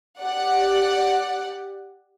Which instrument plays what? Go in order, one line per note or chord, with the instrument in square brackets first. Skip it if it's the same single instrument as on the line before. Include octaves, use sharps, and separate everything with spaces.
[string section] G4 D5 F#5